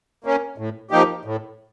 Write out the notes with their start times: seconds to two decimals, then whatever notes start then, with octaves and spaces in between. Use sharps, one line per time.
0.24 A#3 C#4
0.58 A2
0.91 F3 A#3 D#4 G4
1.25 A2